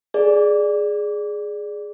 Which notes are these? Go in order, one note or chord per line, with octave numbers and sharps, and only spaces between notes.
G#4 D5